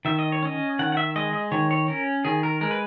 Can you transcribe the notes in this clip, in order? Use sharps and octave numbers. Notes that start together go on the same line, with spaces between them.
D#3 E5
D#5
C#5
C#4 D#5
D#3 F#5
F#5
E5
G#3 D#5
D#5
D#3 C#5
C#5
C#4 A#4
D#3 G#4
A#4
G#3 A#4
B4